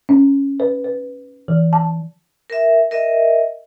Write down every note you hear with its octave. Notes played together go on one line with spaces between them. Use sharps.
C#4
B4
B4
E3
A5
A#4 E5
A#4 D#5 E5